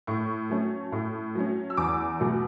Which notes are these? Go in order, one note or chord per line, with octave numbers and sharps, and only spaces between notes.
A2 C#6
F#3 A3 C#4
A2
F#3 A3 C#4
E6
E2 D6
B2 F#3 A3